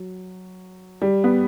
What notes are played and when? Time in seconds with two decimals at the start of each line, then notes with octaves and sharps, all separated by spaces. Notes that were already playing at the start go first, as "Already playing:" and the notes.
Already playing: F#3
1.02 G3
1.24 B3